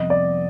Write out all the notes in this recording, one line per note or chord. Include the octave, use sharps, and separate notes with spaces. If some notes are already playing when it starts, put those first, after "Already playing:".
Already playing: F2 C3 G3 B3 D#5
D5